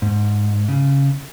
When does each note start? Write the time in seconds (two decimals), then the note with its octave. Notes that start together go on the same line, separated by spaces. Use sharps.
0.02 G#2
0.69 C#3